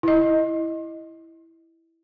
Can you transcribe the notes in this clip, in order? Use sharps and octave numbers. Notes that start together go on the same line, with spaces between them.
E4 D#5